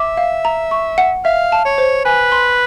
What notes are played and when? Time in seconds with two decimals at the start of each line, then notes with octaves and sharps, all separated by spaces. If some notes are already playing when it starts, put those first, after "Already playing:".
Already playing: E5 D6
0.17 F5
0.45 A#5
0.71 C#6
0.98 F#5
1.24 E5 F5
1.52 A5
1.65 C#5
1.78 C5
2.05 B4 G#5
2.32 C6